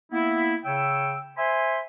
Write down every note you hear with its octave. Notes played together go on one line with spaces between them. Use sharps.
A#3 B3 E4
C#3 C#5 G5 E6
C5 E5 G#5 B5 C6